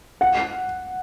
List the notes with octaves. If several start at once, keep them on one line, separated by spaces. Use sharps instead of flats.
F#5